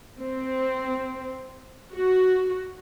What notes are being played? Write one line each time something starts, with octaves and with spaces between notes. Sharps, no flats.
C4
F#4